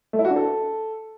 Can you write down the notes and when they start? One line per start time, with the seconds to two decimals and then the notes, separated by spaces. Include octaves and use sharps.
0.13 A3
0.19 E4
0.25 F#4
0.30 D4
0.36 A4